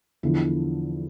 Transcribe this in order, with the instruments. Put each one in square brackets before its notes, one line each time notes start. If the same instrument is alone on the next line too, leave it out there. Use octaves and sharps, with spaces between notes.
[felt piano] E2 D3 F3 E4